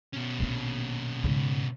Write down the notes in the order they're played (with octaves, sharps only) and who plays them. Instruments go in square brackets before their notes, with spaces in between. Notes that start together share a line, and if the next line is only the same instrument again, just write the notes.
[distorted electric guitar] B2 C#4
[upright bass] A#1 A#3
G#2 C#3